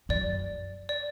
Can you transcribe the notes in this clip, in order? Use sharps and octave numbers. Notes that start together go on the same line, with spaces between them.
F#2 D5
D5